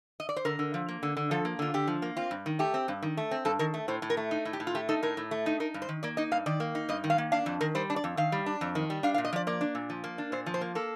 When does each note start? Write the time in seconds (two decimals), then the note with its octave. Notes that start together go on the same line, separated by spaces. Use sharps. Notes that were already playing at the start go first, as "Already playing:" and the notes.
0.20 D#5
0.29 D5
0.36 C5
0.45 D3 A#4
0.59 D3
0.74 F3
0.89 A#3
1.03 D3
1.17 D3
1.31 F3 A4
1.45 A#3
1.59 D3 F4
1.74 D3 G4
1.88 F3
2.02 A#3
2.17 C4 F4
2.31 G2
2.46 D#3
2.59 A3 G4
2.74 C4
2.88 G2
3.03 D#3
3.17 A3
3.31 C4
3.45 G2 A4
3.59 D#3 A#4
3.74 A3
3.88 A2 C5
4.02 A2
4.10 A#4
4.17 A3
4.31 D#4
4.45 A2
4.53 G4
4.60 A2
4.67 F4
4.75 A3 G4
4.89 D#4 A4
5.03 A2 A#4
5.17 A2
5.31 A3
5.46 D#4
5.60 D#4 A#4
5.74 G2
5.82 C5
5.89 D#3
6.03 A#3 D5
6.17 D#4 D#5
6.31 G2 F5
6.46 D#3 D5
6.60 A#3
6.75 D#4
6.89 G2 D#5
7.04 D#3
7.10 F5
7.18 A#3
7.32 D4 F5
7.46 F2
7.61 D#3 A#4
7.75 G3 C5
7.90 D4
7.96 D5
8.04 F2
8.17 D#3 F5
8.32 G3
8.46 D4
8.61 F2
8.75 D#3
8.90 G3
9.03 D4 F5
9.14 F5
9.18 A#2
9.25 D#5
9.33 F3 D5
9.47 A#3 D5
9.61 D4
9.75 A#2
9.90 F3
10.04 A#3
10.18 D4
10.32 A#2 C5
10.46 F3
10.54 C5
10.61 A#3
10.75 A#3 A4